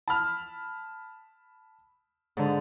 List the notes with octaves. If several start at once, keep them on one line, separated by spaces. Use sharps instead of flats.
A5 B5 F6
G#2 D3